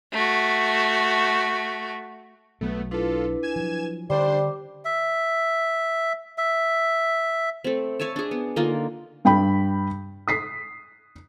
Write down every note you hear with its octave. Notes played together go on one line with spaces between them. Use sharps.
A3 F#4
B1 F#3 A3 B3
D4 E4 F4 A4 B4
G#5 G#6 E7
F3 F#3
D3 G3 C#4 D4 C5 C6 D6
E5
E5
A3 C4
C#5 E5 G#5 A5
D4 G#4
B3
D3 A#3 D#4 F4
G2 G5 B5
D#6 B6 C7